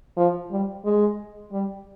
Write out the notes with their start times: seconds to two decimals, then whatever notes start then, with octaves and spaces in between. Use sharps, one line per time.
0.17 F3
0.51 G3
0.85 G#3
1.52 G3